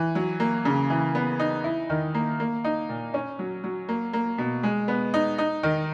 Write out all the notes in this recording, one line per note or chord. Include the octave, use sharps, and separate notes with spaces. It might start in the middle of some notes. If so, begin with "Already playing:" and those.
Already playing: E3
F#3
A#3
C#3
E3
B3
D#4
E4
D#3
A#3
A#3
D#4
A#2
C#4
F#3
F#3
A#3
A#3
B2
G#3
B3
D#4
D#4
D#3